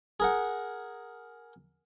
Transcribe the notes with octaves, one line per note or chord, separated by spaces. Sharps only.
G#4 A#4 F#5